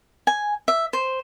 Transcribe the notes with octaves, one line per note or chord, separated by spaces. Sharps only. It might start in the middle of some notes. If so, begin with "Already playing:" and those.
G#5
E5
C5